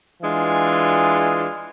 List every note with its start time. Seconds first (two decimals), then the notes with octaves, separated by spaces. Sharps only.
0.22 E3 G#3 D4 F4